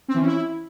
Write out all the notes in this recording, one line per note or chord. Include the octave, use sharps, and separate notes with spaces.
C4
E3
C#4
E4